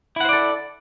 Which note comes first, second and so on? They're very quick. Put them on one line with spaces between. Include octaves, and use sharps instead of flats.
E4 F#5 C5 D5 A4